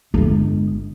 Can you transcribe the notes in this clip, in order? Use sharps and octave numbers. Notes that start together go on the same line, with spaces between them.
G1 G#3